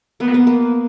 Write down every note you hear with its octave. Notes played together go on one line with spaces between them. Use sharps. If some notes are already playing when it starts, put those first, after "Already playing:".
A#3 B3
B3
A#3